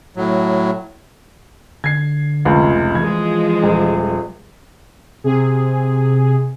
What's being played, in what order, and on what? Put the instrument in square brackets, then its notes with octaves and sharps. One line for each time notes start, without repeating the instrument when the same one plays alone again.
[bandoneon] A2 F#3
[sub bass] D3 [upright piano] G#6 C7
[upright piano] F1 C#2
[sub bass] E3 [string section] F3 G#3 [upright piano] G#6
[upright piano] D#1
[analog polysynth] C3 G#4